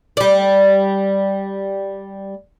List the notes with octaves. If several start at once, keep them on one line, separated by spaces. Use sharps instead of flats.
G3 D5